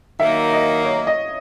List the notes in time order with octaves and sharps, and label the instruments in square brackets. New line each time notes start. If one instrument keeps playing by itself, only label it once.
[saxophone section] D#3 F#3 A#3 D#4 [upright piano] E5
[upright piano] D#5
C#5
D#5